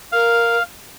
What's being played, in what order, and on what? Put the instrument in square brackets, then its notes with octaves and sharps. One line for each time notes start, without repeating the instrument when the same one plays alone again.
[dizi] A#4 [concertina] F5